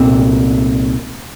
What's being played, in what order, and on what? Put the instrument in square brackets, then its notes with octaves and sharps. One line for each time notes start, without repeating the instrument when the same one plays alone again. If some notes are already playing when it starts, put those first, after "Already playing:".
Already playing: [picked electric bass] C2 A#2 C4